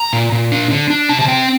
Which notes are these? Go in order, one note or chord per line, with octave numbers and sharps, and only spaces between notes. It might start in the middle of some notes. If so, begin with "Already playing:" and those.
Already playing: A#5
A#2
A#2
D4
D3
D4
C3 A5
A5
C4 G5